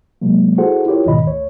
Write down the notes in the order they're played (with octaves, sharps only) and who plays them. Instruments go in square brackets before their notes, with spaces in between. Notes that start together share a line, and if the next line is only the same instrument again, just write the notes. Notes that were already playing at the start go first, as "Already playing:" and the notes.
[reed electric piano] C3 F#3 G#3 A#3
E4 F#4 G#4 A4 C5 F#5
E4 F4 G4 A#4 C#5
D2 G#2 B2 D#3 D#5 B5
D2 C#5